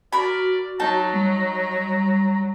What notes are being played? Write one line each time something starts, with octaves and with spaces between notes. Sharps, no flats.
F#4 A#4 D5 B5
F#3 D#4 A5 A#5
G3